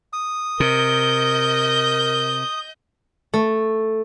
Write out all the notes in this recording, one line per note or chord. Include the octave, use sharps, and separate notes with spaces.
D#6
C3 A#4 D#5 G6
A3